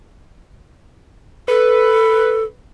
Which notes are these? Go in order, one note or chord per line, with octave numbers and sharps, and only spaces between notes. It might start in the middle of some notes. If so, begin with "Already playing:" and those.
A4 B4